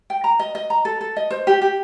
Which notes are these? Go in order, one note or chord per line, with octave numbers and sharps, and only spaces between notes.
G5
A#5
D#5
D#5
A#5
A4
A4
D#5
C5
G4
G4